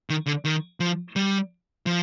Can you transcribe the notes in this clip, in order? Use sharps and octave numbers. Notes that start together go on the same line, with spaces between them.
D#3
D3
D#3
F3
G3
F3